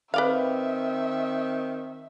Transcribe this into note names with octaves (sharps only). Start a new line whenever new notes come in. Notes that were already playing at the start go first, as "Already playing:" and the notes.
D#3 C4 B4 D5 E5 F5